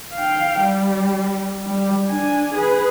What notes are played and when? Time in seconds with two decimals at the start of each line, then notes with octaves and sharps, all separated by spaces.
0.14 F5 G5
0.60 G3
1.67 G3
2.09 D4 G#5
2.54 G#4 B4